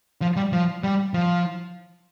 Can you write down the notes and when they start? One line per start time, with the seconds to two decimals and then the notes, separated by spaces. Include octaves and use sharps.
0.22 F3
0.36 G3
0.52 F3
0.84 G3
1.14 F3